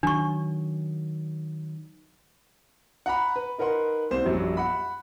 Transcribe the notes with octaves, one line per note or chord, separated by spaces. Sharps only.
D#3 F#3 D4 C#6
F#5 A#5 B5
B4
D#4 A#4 B4 F#5 C6
C2 C5 E7
A#1 F#2 F#3 G3
F#5 B5